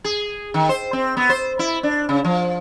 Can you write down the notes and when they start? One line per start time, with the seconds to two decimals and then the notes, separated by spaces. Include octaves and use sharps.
0.04 G#4
0.54 D#3
0.69 C5
0.93 C4
1.17 B3
1.29 C5
1.59 E4
1.83 D4
2.09 C#3
2.25 F3